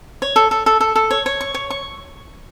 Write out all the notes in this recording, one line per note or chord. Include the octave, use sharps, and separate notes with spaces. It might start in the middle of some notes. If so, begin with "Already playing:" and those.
C#5
A4
A4
A4
A4
A4
C#5
C#5
C#6
C#5
C#6